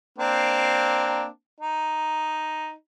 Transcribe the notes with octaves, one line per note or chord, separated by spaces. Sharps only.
A#3 C4 D4
D#4